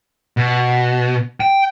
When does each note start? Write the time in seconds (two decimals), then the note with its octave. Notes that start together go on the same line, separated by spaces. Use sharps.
0.37 B2
1.40 G5